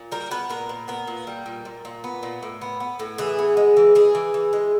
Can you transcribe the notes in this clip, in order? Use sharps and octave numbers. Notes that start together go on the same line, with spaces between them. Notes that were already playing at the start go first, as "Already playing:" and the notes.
Already playing: A#2
G3 A#4
B3 B4
A#2 A#4
A#2
B3 A#4
A#2
G3
A#2
A#2
A#2
B3
A#2
A2
B3
B3
A2
E3 G#4
B3
G#3
E3
E3 G#4
E3
E3
G#3